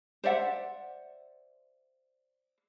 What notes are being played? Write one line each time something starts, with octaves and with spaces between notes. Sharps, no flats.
C5 D5 E5 F#5